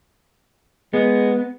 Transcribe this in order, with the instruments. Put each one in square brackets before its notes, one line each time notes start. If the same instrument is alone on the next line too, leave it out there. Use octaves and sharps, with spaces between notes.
[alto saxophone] G#3 [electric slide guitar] B3